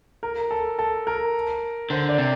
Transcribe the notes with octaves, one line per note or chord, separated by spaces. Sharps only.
A#4
A4
A4
A#4
D3 C5
D5
C3